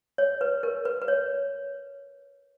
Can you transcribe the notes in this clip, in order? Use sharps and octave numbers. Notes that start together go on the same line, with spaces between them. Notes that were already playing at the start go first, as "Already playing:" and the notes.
C#5
B4
A#4
B4
B4
C#5